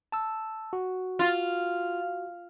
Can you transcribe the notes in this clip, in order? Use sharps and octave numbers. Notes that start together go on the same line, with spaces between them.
A5 E6
F#4
F4